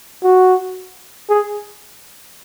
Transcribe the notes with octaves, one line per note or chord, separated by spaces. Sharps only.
F#4
G#4